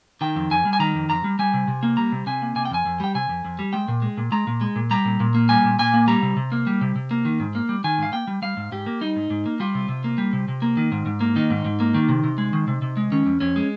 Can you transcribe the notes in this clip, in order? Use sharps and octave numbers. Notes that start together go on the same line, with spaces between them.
D#3 G5
F2
F2 G#5
G3
G#5
D#3 A#5
F2
F2 A#5
G3
G3 G#5
C3
C3
A#3
G3 A#5
C3
C3 G#5
A#3
C3 G#5
G5
F2 G#5
F2
G3 G5
C3 G#5
F2
F2
G3
G#3 G5
A#2
G#3
A#2
G#3 A#5
A#2
G#3
A#2
G3 A#5
A#2
A#2
A#3
G3 G#5
A#2
A#2 G#5
A#3
G3 A#5
C3
C3
A#3
G3
C3
C3
A#3
D#3
G#2
A#3
G3
D#3 G#5
G#2 F5
A#3 G5
G3
G3 F5
G#2
G#2 G4
A#3
G3 D#4
G#2
G#2
A#3
G3 F4
C3
C3
A#3
G3
C3
C3
A#3
D#3
G#2
G#2
A#3
D#3 D#4
G#2
G#2
A#3
D#3
C3
C3
G#3
D#3
C3
C3
G#3
D#3 C#4
F2
F2 C#4
G#3